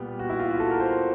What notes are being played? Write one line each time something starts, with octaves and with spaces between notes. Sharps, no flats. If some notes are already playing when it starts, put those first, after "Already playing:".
Already playing: A#2 G3 B3 G4
F#4
E4
F4
F#4
A4
A#4
C5